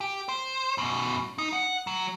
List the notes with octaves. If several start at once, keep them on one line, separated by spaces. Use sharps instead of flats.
G4
C5
F#2 B2
D#4
F#5
F#3